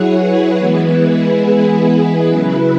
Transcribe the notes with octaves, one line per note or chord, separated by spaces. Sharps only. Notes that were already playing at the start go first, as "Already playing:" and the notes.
Already playing: F#3 E4 G#4 C#5 F#5
B4
E3 G#3 B3 E4 B4
G#4
B4
B4
C#3 F#3 E4 B4